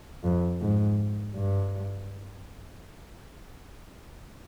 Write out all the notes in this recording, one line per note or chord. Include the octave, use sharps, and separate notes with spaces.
F2
G#2
G2